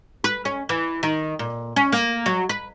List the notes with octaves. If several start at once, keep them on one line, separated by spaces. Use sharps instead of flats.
B4
C#4
E3
D#3
A#2
C#4
A#3
F#3
B4